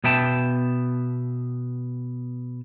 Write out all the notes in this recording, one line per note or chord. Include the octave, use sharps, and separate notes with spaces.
B2 B3 E5 G5 A5